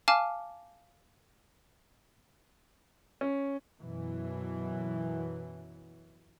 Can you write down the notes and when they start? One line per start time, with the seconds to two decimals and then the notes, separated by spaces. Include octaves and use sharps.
0.08 F5 G#5 A5 D6 F6
3.21 C#4
3.79 F#2 B2 E3 F#3